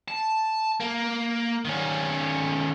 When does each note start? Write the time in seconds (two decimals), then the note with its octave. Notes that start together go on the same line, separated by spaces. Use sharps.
0.08 A5
0.80 A#3
1.65 D#3 C#4